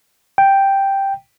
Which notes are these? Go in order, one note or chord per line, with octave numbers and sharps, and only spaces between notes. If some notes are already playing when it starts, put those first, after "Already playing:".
G5